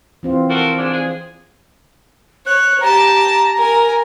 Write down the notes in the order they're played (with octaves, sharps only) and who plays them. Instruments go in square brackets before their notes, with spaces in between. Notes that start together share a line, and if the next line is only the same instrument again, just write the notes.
[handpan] E3 C4 F4
[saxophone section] F#4 A4 A#4
G#2 D4
G#4
[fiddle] C#5 [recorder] F#6
[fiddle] G4 A5 [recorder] A#5
[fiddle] A#4 G#5